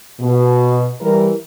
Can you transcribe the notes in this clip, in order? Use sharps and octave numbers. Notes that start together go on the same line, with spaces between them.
B2
E3 G3 A#4